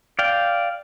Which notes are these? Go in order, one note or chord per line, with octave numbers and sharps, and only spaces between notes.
D5 F5 G5